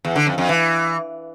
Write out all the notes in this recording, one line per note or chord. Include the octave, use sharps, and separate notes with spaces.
E2
D3
F2
F2
E3